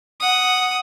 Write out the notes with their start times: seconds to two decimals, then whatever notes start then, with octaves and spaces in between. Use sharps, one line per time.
0.20 F#5 D#6